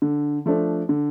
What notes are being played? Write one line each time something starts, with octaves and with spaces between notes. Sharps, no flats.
D3
F3 A3 D4
D3